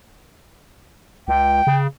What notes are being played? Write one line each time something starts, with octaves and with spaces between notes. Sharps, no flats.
C#2 G5
C#3